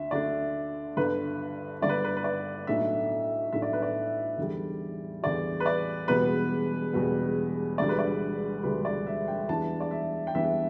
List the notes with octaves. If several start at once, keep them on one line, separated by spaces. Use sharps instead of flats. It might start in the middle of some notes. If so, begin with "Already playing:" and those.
Already playing: D2 D4 E5
D2 D3 A3 D4 D5
G1 G2 D3 B4
G1 G2 D3 D5
B4
B4
B4
D5
B1 A2 A3 D4 E5
B1 A2 A3 D4 E5
D5
B4
D5
E2 D3 G3
E2 D3 G3 D5
B4
D5
E1 E2 B2 G3 B3 B4
E1 E2 B2 G3 B3
E1 D2 D3 G3 D5
B4
D5
E1 D2 D3 G3 B4
D5
E5
G5
E2 E3 G3 B3 D4 A5
D5
E5
G5
E2 E3 G3 B3 D4 E5